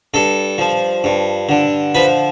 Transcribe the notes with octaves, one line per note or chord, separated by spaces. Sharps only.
G2 A4
F3
G2
D3
F3 B4